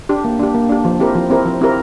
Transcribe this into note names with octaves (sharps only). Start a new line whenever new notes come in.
D4 G4
A#3
D4 G4
A#3
D4 G4
F3
C4 E4 G4 A#4
F3
C4 E4 G4 A#4
F3
C4 E4 G4 A#4